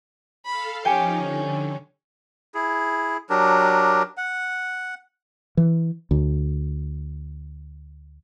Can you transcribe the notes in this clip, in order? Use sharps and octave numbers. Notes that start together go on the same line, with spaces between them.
A4 F5 B5
F3 C#4 D#4 G4 G5 G#5 C#7
D3 C#4
E4 G#4
F#3 D4 G4 A#4
F#5
E3
D2